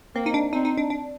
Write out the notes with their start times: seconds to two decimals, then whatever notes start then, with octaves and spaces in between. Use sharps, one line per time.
0.15 A#3 C4
0.26 D#4
0.34 D4
0.53 C4 D#4
0.65 D#4
0.77 D4
0.90 D4